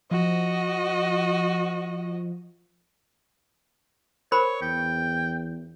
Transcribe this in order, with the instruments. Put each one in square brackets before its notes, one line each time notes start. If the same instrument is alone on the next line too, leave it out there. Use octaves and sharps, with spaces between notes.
[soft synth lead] F3 [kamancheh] F#4 D#5
[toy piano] A#4 C5 B5 [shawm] C#5
[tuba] E2 [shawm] G5